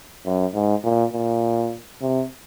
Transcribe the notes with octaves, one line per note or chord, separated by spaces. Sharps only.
F#2
G#2
A#2
A#2
C3